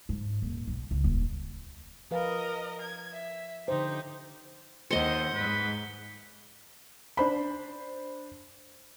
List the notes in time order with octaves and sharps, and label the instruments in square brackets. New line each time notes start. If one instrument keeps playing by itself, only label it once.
[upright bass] G#2
D#1
B1
C#2
D#1
[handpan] F3 B4 F5 [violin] A#4 D#5
[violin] G#6
E5
[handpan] D3 F3 C5 [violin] D#4 G4
[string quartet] D#2 F#5 [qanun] C5 D#5 [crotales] C#7 G7
[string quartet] G#2 [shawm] B4
[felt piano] D4 C5 B5